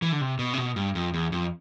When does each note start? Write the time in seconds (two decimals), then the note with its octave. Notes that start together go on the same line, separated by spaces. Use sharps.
0.02 E3
0.12 D3
0.21 C3
0.39 B2
0.53 C3
0.58 B2
0.76 G2
0.95 F2
1.14 E2
1.32 F2